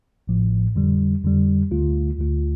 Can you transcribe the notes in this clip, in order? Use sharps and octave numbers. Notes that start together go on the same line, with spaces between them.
A1 A2 F3
F2 D3 G3
F2 D3 G3
D2 D3 A3 F4
D2 D3 A3 F4